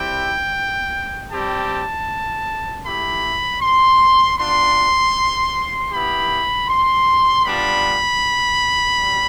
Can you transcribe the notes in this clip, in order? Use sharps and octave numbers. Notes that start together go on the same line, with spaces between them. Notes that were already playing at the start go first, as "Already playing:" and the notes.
Already playing: G3 C4 E4 G4 G5
G3 C4 G4 A5
A3 E4 G4 B5
C6
B3 D4 F4 C6
B3 E4 G4 B5
C6
G3 B3 D4 F4 B5
G3